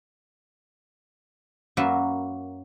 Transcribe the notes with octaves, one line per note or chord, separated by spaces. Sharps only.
F#2 F#3 A#3 F#4 B4 E5